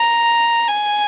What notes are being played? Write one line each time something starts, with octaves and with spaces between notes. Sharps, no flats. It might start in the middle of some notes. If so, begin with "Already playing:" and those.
Already playing: A#5
G#5